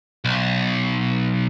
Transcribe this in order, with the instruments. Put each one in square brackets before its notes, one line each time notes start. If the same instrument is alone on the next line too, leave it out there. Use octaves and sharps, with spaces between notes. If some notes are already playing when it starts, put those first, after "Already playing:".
[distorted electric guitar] B1